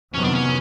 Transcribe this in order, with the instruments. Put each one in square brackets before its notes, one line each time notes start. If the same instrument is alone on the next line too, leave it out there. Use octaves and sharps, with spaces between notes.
[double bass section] F2 C3 D#3 F#3 B3 [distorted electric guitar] C#4
[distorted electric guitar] D4
C#4